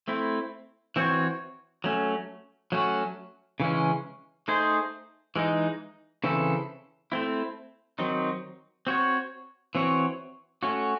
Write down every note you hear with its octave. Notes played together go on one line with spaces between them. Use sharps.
A3 C4 E4
E3 C4 F#4 C#5
F#3 A3 C#4
F#3 A3 C#4 F#4
C#3 E3 G#3 C#4
A3 D#4 G#4 C5
E3 G#3 D#4
C#3 E3 C4 E4 A4
A3 C4 E4
D#3 F#3 C4 D#4
C4 F#4 C#5
E3 C4 F#4 C#5
A3 C#4 F#4